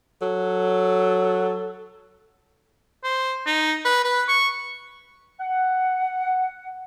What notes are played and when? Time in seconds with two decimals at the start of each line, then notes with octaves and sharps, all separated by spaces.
0.22 F#3 A4
3.04 C5
3.46 D#4
3.85 B4
4.05 B4
4.28 C#6
5.40 F#5